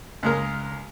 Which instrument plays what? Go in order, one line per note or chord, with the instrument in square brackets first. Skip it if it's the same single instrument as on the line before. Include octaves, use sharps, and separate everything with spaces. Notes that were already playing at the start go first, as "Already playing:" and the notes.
[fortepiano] C#2 G#3 A#4